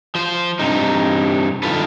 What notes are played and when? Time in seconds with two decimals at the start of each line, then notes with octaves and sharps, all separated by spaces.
0.15 F3 C5
0.59 G2 C3 D#4
1.63 G2 D#3 F4 A4 B4